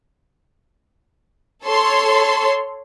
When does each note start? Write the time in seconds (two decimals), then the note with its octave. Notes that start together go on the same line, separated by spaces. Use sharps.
1.65 A4 C#5 C6